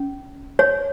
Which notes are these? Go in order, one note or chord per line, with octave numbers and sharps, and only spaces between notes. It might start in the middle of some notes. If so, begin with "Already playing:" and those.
Already playing: C#4
C#5